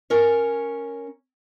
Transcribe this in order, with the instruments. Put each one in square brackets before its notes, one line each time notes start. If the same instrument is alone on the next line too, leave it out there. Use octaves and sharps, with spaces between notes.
[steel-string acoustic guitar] C#4 A#4 C#5